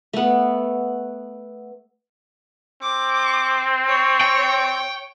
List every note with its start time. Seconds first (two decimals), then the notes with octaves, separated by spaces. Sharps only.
0.13 A3 B3
2.82 C4 D6
3.88 C#5
4.21 G5